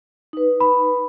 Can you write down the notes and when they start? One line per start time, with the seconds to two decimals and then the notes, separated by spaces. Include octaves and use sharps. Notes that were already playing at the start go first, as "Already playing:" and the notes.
0.33 D#4 B4
0.60 B5